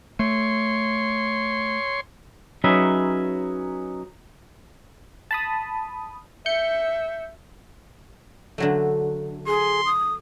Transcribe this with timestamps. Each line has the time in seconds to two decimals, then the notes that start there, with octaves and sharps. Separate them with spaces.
0.19 A3 C#5 C6
2.64 F#3 C#4 D#4 G#4 B4 E5
5.31 A5 B5 D#6
6.46 E5 G6 C#7
8.58 D3 F#3 A3
9.47 G#4 C6
9.86 D#6